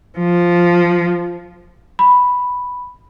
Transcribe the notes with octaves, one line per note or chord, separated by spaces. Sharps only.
F3
B5